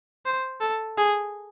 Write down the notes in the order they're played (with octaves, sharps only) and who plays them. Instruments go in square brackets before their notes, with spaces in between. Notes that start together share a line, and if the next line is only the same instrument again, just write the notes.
[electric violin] C5
A4
G#4